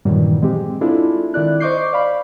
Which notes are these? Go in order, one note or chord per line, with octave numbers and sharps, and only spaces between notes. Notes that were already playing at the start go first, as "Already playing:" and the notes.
G2 A#2 D#3 E3 F#3 G3
G#3 C4 G4
G#3 C4 D4 E4 F4 A4
D#3 E4 D5 F#6
C5 D#5 C#6 D6 G6 C7
D5 F5 B5